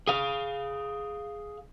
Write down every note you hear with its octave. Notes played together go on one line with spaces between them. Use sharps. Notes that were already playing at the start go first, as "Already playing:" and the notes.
G#4 F5